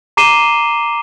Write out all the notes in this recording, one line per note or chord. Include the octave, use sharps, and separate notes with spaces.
A#5 D6 C7 D#7 E7 G7